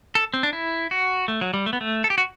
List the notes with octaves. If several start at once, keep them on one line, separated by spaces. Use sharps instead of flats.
A4
C4
D4
E4
F#4
A3
F#3
G3
A3
B3
A3
A4
G4
F#4